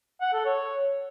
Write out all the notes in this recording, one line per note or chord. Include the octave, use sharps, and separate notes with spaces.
F#5
A4
C#5